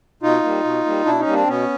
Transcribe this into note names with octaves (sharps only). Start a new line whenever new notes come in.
B2 D#4 F4
G3 A#3
B2
G3 A#3
B2 D4 E4
C#4 D#4
G3 A#3
C4 D4
B2 B3 C#4